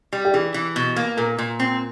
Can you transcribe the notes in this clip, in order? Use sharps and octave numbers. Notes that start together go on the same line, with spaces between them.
G3
G4
E3 G#4
E3
B2
A#3
A#2 A#4
A#2
C4